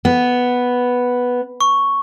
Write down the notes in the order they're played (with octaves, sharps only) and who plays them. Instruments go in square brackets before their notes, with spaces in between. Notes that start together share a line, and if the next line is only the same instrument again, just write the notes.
[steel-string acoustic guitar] B3
[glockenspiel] C#6